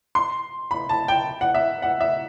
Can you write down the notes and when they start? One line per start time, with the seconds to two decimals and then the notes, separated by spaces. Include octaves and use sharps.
0.15 C6
0.71 B5
0.89 A5
1.08 G5
1.41 F#5
1.55 E5
1.82 F#5
2.01 E5